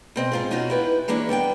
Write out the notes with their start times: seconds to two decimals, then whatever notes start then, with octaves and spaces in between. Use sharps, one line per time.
0.16 B2 C4 D#5
0.32 G#2 F4 G#4
0.51 B2 C#4 D#4 F4 F#4
0.70 E4 G4 B4
1.08 E3 G#3 A#3 C#4 D4 E4
1.29 G3 B3 F#5 G5